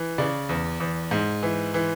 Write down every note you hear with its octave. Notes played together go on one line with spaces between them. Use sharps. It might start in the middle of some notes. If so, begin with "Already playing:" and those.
Already playing: E3
C#3 D5
E2
E2
G#2
E3
E3